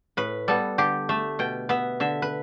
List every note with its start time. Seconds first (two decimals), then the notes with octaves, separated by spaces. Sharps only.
0.17 A2 B4
0.48 G3 B3 A4
0.78 D3 G4
1.09 A3 E5
1.39 B2 G5
1.69 B3 E5
2.00 D3 E5
2.22 B4